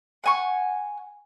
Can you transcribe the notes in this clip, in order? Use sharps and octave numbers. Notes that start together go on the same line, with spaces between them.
F#5 G#5 C#6